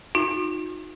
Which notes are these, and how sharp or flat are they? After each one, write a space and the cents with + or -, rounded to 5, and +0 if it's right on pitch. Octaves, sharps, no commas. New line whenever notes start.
D#4 +0 F#4 -45